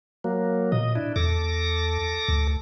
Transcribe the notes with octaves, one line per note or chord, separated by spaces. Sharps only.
F#3 A#3
A#2 D#5
D4 E4
E2 A4 D6 A#6
D2